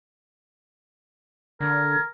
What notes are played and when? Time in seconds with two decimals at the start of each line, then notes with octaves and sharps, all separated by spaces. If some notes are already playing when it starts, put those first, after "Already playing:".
1.60 D3 A#4 G#6